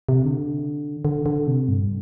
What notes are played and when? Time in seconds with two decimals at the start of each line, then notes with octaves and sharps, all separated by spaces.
0.09 C3
0.25 D3
1.05 D3
1.26 D3
1.47 C3
1.69 G2